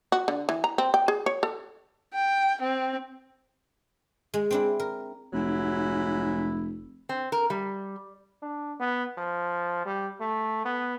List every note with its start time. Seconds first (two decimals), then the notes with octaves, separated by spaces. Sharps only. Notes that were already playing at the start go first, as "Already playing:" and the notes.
0.12 F#4
0.28 D3
0.49 E3
0.64 A#5
0.78 C4
0.94 G5
1.08 G#4
1.26 C#5
1.43 A4
2.13 G5
2.61 C4
4.34 G#3
4.51 C4 D4 E4
4.80 A#4
5.33 F1 G#2 F#3 E4
7.09 C4
7.32 A#4
7.50 G3
8.42 D4
8.80 B3
9.18 F3
9.86 G3
10.21 A3
10.65 B3